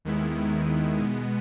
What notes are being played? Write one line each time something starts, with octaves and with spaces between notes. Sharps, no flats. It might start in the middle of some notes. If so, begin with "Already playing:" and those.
D#2 D#3 G#3 B3 E4
B2 G#3 B3